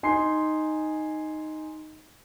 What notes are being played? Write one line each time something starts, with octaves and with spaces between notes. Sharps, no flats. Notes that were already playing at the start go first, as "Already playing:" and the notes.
D#4 G#5 C6 C7